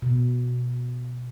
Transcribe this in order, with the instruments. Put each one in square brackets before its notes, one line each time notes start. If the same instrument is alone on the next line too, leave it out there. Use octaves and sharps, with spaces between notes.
[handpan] B2